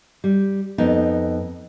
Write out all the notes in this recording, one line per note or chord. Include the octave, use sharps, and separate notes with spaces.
G3
F2 B3 D#4